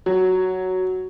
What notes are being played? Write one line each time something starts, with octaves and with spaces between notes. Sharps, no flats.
F#3